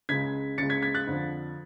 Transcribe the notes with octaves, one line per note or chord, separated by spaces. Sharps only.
C#2 C#3 G#3 G#6 B6
C#2 C#3 G#3 A6 C#7
G#6 B6
G#6 B6
F#6 A6
F2 D3 F3